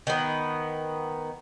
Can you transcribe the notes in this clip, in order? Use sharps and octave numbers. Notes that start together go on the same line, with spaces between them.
D#3 B3